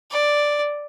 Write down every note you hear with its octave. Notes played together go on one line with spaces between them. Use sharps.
D5